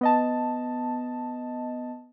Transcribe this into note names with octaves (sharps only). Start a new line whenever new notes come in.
B3 D#5 A5